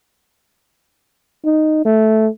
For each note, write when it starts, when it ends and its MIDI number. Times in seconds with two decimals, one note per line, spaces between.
1.45 1.80 63
1.85 2.28 57